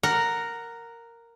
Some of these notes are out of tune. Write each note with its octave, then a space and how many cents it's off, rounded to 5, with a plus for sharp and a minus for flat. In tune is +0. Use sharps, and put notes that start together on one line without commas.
A#4 -5 F#5 +0